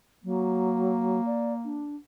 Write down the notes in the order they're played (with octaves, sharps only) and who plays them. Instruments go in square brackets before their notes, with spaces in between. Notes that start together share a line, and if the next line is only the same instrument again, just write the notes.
[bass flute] F#3 [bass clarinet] A#3
[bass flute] D5
D4